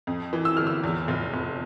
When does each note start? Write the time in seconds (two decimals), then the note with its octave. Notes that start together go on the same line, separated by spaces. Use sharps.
0.07 F2
0.33 E3
0.45 E6
0.57 G1 F6
0.67 E6
0.84 E2
1.08 F1
1.34 F1